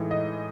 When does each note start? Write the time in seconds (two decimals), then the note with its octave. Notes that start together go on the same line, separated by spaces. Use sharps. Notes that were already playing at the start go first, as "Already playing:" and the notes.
Already playing: A2 E3 G#3 D#4
0.11 D#5